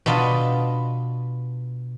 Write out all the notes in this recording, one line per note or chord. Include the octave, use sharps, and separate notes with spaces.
B2 B3 D4 F4 D#5 B5